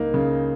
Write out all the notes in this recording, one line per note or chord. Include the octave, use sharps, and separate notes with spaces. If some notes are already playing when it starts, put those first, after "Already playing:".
Already playing: C#2 A#3 D#4
C#3